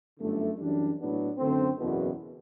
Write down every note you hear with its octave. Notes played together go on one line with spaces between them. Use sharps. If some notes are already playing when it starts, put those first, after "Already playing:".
G1 F#2 D3 A3
F#2 E3 G3 D4
A2 F#3 B3 D4
F#2 D3 A3 C4
F#1 E2 B2